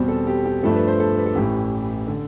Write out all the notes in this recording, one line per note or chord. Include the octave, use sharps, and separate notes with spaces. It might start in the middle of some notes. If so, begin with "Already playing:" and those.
Already playing: E2 B2 G3 C4 G4
A4
G4
G4
G2 F3 A3 D4 A4
B4
C5
A4
B4
A4
A1 A2 E3 G4
D3 A4